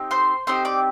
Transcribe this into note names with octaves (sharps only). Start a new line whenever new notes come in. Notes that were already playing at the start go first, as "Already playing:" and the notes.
Already playing: C4 D#4 G4
C5 C6
C4 D#4 G4 C5 C6
D5 D6